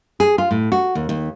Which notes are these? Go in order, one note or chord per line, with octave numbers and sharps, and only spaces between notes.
G#4
F4
A2
F#4
D#2
D#2